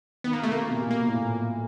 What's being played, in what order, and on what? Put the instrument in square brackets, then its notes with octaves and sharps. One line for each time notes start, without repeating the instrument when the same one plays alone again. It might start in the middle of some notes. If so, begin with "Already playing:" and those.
[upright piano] D#3 [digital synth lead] B3
[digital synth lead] A#3
[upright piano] C3
[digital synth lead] A3
A#3
[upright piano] C3
B2
A#2
B2
[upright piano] C3 [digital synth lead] A#3
[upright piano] B2
A2
A#2